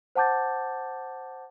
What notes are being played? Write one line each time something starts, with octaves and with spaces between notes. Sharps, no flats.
C5 F#5 A5 D6 G6 A6